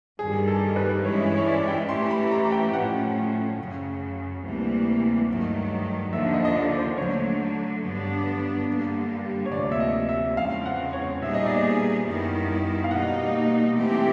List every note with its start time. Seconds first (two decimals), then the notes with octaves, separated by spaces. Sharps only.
0.19 G2 D#3 G3 G#4
0.48 A4
0.76 B4
1.04 G2 E3 G#3 C#4 E4 C#5
1.26 C#5
1.38 C#5
1.46 D5
1.68 G5
1.89 E3 A3 C#4 E4 G4 C6
2.11 B5
2.31 A#5
2.52 G5
2.69 G5
2.73 A2 F3 A3 C#4 F#5
3.59 F#2 C#3 F#3
4.43 D2 C3 E3 G3 A#3
5.28 G2 D#3 F#3 A3
6.13 D#2 D3 F3 E5
6.34 D#5
6.45 D#5
6.56 D5
6.77 C5
6.98 D3 F#3 A3 C#5
7.83 G2 D3 F#3 B3 D4
8.68 G2 D3 G3 A#3
9.46 C#5
9.52 D2 C3 F3 A#3 D5
9.72 E5
9.80 D#5
10.09 E5
10.37 E2 C#3 F3 G#3 C4 F5
10.66 F#5
10.93 C#5
11.22 A#2 G3 B3 D#4 G#4 E5
11.34 D#5
11.46 D5
11.56 D#5
12.07 F#2 D#3 G3 B3 E4
12.84 F5
12.91 B2 G3 A#3 D#4 F#5
13.77 E3 A3 C4 E4 G4
13.95 G5